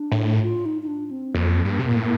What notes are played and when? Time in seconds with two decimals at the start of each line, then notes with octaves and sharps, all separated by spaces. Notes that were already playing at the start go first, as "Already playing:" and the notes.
Already playing: D4
0.12 A2
0.42 F4
0.66 D#4
0.83 D#4
0.87 D4
1.11 C4
1.34 F2 A#3
1.65 G2
1.79 C3
1.88 A#2
1.96 A2